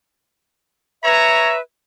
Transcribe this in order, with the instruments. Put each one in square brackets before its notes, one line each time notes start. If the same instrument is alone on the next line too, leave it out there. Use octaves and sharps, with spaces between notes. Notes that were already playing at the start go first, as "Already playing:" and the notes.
[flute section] B4 E5 [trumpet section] C#5 A#5